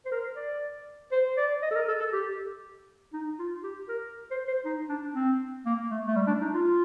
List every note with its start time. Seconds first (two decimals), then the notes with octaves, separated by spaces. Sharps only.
0.06 C5
0.12 A#4
0.36 D5
1.12 C5
1.37 D5
1.63 D#5
1.71 A4
1.76 A#4
1.88 A4
2.00 A4
2.13 G4
3.13 D#4
3.39 F4
3.63 G4
3.89 A#4
4.31 C5
4.48 C5
4.65 D#4
4.89 D4
5.14 C4
5.66 A#3
5.91 A3
6.07 A3
6.16 G3
6.28 D4
6.42 D#4
6.53 F4